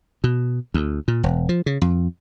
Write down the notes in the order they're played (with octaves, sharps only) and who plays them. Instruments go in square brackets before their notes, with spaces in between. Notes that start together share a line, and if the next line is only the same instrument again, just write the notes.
[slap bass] B2
D2
A#2
E1
F3
C#3
F2